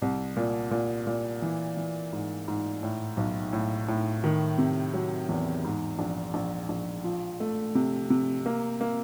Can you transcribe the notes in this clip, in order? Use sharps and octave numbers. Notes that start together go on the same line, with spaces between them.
C2
A#2
A#2
A#2
E3
E3
G#2
G#2
A2
B1
A2
A2
D#3
C3
F#3
E2
G#2
A#1
A#1
A#1
F3
A3
C3
C3
A#3
A#3